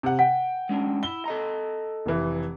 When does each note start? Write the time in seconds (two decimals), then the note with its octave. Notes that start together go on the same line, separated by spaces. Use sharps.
0.03 C3 F#5
0.19 F#5 G5
0.69 G#3 C#4 D4
1.03 E4 G7
1.26 A4 D#5 A#5
2.06 F1 E3